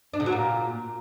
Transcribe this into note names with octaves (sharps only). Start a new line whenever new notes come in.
D4
C#3
F#3
A#2